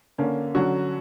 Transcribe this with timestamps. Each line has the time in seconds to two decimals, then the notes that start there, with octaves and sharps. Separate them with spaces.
0.18 D3 A#3 C#4
0.55 D3 F#3 C#4 F#4